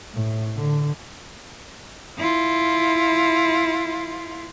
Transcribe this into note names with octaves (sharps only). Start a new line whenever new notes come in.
A2
D3
E4 F4